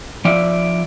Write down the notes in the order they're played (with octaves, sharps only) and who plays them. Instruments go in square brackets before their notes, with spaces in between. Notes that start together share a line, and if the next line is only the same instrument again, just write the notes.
[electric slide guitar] F3 D5 E5